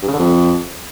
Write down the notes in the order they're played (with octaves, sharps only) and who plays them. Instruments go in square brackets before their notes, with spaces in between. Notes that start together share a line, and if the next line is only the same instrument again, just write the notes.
[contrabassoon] G2
C#3
D3
F2